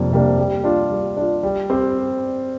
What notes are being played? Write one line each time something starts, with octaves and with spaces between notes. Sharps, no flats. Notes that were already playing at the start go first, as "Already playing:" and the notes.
Already playing: F2 C3 G3 A#3 D4
C3 G3 A#3 D4
G3
D4 F4
G3
D4 F4
G3
C4 G4 C5